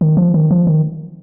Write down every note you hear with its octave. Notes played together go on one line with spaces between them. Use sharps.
D#3
F3
D#3
F3
D#3